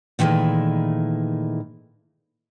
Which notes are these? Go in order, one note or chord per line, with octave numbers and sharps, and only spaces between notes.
A#2 D#3 E3 F#3 G#3 A3